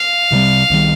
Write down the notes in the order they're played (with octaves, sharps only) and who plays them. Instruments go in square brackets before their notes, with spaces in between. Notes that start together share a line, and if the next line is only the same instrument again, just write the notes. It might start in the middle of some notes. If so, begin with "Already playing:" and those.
Already playing: [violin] F5
[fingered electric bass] C2 C3 D#3 G3
C2 C3 D#3 G3